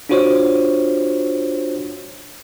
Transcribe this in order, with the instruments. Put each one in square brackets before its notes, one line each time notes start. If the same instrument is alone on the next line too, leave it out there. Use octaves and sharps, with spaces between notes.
[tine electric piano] D4 F4 F#4 C5 C#5